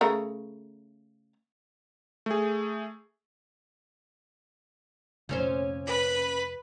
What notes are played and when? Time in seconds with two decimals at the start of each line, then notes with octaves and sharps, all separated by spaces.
0.01 C#3 A3 A#4
2.26 A3 G#4
5.29 F1 A#2 C#4 C5
5.86 B4